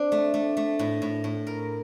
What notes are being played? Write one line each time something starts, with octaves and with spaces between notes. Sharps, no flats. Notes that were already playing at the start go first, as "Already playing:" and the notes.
Already playing: C4 D4
A3
A3
A3
A2
A2
A2
A#4